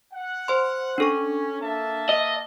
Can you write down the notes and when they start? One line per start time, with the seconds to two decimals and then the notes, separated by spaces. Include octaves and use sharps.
0.13 F#5
0.48 C5 C6
0.98 C#4 D4 A4 C#6
1.60 A#3 E5 A5
2.09 D#5